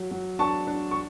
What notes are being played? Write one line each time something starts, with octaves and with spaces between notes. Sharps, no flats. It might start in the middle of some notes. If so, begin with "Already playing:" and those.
Already playing: F#3
F#3
D4 A5 C#6
D4
C#6